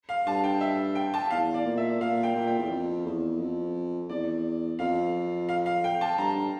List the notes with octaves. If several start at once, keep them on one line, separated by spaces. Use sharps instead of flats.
F5
G2 A5
G5
E5
G5
A5
E2 F5
D5
A#2
E5
A#2 F5
G5
A#2
G5
E2
F2
E2
F2
E2 D5
F2 F5
F5
F5
G5
A5
G2 A#5